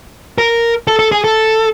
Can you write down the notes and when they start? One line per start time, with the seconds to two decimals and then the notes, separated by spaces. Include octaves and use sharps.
0.38 A#4
0.87 A4
0.99 A4
1.12 G#4
1.24 A4